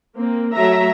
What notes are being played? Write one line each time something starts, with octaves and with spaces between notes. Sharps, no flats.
A#3 C4
F#3 A3 E5 A#5